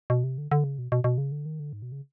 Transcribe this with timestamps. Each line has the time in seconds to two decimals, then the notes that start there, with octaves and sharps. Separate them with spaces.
0.10 B2
0.24 C3
0.38 D3
0.52 D3
0.64 C#3
0.79 B2
0.92 B2
1.04 B2
1.18 C#3
1.32 D3
1.46 D#3
1.60 D3
1.73 G#2
1.82 B2
1.92 C#3